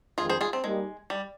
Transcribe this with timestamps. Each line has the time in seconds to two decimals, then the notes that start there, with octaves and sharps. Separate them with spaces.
0.18 F2 D#3 G#3 F4 G#4
0.29 G#4 C5
0.41 F4 G#4
0.53 C4
0.64 G3 G#3 A#3 D#4 G4 A#4
1.10 G3